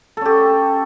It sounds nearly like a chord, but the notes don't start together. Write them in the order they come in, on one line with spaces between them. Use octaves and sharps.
A4 C#4 G4